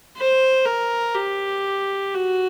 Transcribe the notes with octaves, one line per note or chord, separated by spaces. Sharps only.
C5
A#4
G4
F#4